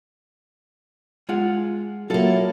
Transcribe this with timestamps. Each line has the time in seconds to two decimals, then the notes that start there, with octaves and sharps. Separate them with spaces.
1.29 G#3 F4 F#5
2.10 F#3 A#3 E4 F4 A4